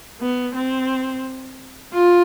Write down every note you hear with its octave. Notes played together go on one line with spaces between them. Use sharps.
B3
C4
F4